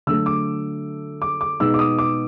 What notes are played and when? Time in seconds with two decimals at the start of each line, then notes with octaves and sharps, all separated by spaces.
0.07 D3 F#3 A3 E6
0.26 D6
1.22 D6
1.41 D6
1.60 B2 G#3 B3 D#4 E6
1.74 D6
1.79 D#6
1.99 D6